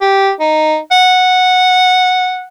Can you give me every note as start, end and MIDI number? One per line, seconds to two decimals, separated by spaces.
0.01 0.30 67
0.40 0.78 63
0.91 2.47 78